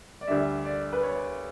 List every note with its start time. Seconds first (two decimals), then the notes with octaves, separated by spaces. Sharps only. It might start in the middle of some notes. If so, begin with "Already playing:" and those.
0.21 D5
0.28 D2 D3 G3 D4 E5
0.65 D5
0.92 B4
1.03 C#5